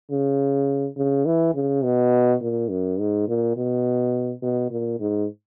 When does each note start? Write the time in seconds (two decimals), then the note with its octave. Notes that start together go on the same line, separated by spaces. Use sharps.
0.11 C#3
0.97 C#3
1.26 E3
1.55 C#3
1.84 B2
2.41 A#2
2.70 F#2
2.99 G#2
3.28 A#2
3.57 B2
4.42 B2
4.70 A#2
5.00 G#2